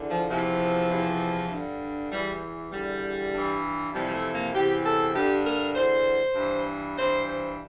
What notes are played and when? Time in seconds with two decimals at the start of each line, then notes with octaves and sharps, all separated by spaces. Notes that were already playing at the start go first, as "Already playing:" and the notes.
Already playing: E2 D3
0.09 F3
0.29 E2 C3 E3 F3
0.89 E2 C3 E3
1.51 G2 D3
2.10 E2 E3 G3
2.71 E2 D3 G3
3.33 G2 E3
3.93 F2 C3 E3 G3
4.07 G3
4.13 A3
4.34 A#3
4.54 E2 C3 E3 G4
4.84 A4
5.14 G2 D3 G4
5.45 A#4
5.75 E2 D3 C5
6.35 G2 E3
6.97 G2 E3 C5
7.26 C5